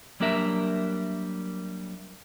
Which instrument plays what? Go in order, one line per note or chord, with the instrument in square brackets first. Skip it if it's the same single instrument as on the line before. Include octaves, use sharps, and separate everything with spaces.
[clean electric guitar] F#3 G3 A#3 D4 A#4 E5